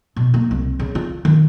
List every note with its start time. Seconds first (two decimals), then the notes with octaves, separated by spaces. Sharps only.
0.16 B2
0.34 A#3
0.51 C2
0.79 C#3
0.95 F4
1.25 D#3